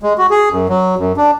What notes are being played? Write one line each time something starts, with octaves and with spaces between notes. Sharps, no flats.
G#3
F#4
G#4
F#2
F#3
F#2
D4